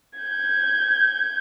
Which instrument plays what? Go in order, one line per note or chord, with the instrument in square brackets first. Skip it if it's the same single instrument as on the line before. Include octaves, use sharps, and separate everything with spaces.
[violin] G6 G#6